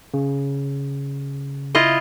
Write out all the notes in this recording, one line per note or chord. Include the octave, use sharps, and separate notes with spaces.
C#3
E4 F4 D#5